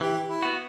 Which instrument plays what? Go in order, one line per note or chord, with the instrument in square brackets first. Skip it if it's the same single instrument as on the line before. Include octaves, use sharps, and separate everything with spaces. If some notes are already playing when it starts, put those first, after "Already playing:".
[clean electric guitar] E3 [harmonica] G4
[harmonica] E4
[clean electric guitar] B3 F#4